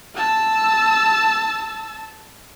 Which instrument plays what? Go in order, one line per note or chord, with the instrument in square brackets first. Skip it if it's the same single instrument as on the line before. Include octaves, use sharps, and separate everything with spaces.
[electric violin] A5 E6